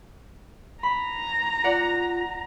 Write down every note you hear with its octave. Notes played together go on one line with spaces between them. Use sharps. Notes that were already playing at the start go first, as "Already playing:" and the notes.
A#5 B5
F4 D5 F#5 C#7